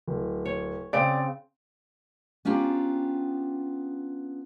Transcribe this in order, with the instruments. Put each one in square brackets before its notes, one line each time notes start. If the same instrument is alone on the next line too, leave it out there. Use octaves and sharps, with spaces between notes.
[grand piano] D1
[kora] C#5
[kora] C#3 C4 [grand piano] D5 D7
[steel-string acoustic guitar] B3 C#4 D4 F4 G4 A#5